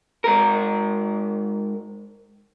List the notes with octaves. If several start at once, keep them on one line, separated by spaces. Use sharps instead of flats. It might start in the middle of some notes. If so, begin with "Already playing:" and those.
G#2 A#4